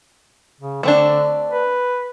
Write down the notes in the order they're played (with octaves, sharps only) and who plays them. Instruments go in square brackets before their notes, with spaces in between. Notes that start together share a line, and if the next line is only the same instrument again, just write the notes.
[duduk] C#3
[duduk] D3 [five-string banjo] A3 C4 D4
[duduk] B4